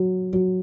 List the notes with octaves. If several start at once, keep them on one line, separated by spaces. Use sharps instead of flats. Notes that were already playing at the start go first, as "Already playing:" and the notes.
Already playing: F#3
F#3